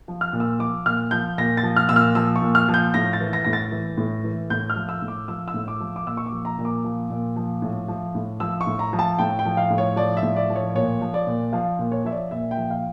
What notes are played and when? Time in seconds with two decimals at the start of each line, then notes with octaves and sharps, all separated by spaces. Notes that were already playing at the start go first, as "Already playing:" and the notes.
0.08 F3
0.21 F6
0.33 A#2
0.40 E6
0.59 F3 D6
0.86 A#2 F6
1.11 F3 G6
1.38 A#2 A#6
1.57 A6
1.63 F3
1.76 F6
1.89 A#2 E6
1.96 F6
2.15 F3 E6
2.36 C#6
2.42 A#2
2.55 F6
2.68 F3
2.74 G6
2.94 A2 A#6
3.13 A6
3.21 E3
3.33 A#6
3.44 A2 A#6
3.53 A6
3.72 E3
3.97 A2
4.24 E3
4.50 A2 G6
4.70 F6
4.76 F3
4.89 E6
5.02 A2
5.08 D6
5.28 F3 E6
5.48 E6
5.54 A2
5.68 D6
5.80 F3
5.96 D6
6.06 A#2 E6
6.17 C#6
6.26 D6
6.32 F3
6.45 A#5
6.58 A#2
6.65 D6
6.84 F3
7.10 A#2
7.36 F3
7.62 A2
7.88 F3
8.15 A2
8.40 F3 E6
8.61 C#6
8.67 A2
8.79 A#5
8.93 F3
8.99 A5
9.19 A2 G5
9.39 G5
9.45 F3
9.57 F5
9.70 A2
9.78 C#5
9.96 F3 D5
10.17 E5
10.23 A2
10.36 D5
10.50 F3
10.55 C#5
10.75 A#2 C#5
11.01 F3
11.14 D5
11.27 A#2
11.53 F3 F5
11.79 A#2
11.92 C#5
12.05 F3 E5
12.11 D5
12.31 A#2 E5
12.51 G5
12.57 F3
12.70 F5